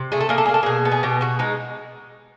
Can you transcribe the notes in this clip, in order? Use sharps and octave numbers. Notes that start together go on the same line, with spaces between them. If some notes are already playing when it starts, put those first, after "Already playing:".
Already playing: C3
A3 G#4
A4
A#3 G#4
A4
G#4
A#3
A4
B2 G#4
B3
G#4
B2 G4
B2 F#4
G#3 D#4